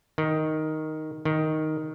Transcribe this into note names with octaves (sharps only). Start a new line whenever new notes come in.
D#3
D#3